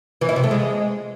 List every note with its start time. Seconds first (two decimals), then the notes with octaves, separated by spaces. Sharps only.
0.21 E3
0.29 E4
0.36 C3
0.44 A3
0.51 G#3